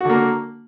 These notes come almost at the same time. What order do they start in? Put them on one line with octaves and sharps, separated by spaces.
F#4 D3 A#3